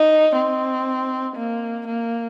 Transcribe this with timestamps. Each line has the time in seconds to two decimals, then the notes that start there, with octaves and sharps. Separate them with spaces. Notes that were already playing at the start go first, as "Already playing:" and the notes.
Already playing: D#4
0.36 C4
1.36 A#3
1.87 A#3